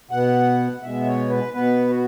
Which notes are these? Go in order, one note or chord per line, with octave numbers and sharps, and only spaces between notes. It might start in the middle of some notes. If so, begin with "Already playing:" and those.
B2 B3 F#5
B2 G#3 B3 E5
C#5
B4
B2 B3 B4
F#4